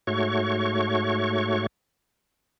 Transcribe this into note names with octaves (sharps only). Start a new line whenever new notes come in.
G#2 A3 F#4 C#5 C#6